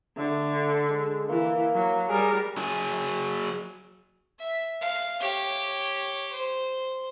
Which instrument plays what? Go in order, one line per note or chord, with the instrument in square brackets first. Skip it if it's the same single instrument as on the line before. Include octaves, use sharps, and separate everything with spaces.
[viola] D3 [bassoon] A3
[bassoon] G#3
[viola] E3 [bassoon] A#3
[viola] F#3
[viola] G3 A#4 [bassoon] G#4
[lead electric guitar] F#3 G#4
[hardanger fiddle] E5
F5
G4 C#5
C5